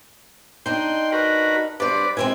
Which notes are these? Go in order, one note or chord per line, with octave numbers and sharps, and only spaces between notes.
D4 D#4 G5 C6
F#4 A#4 B4
G2 B4 C5 D5
G#3 C4 E4 G#5